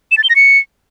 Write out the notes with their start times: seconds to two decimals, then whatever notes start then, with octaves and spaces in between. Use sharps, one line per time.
0.11 E7
0.18 A6
0.24 G7
0.30 A#6
0.36 C#7